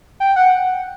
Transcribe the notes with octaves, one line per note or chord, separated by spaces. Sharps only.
G5
F#5